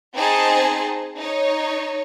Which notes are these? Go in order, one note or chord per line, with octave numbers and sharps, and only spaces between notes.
C4 D#4 G#4 C5 D#5 A5
D#4 C#5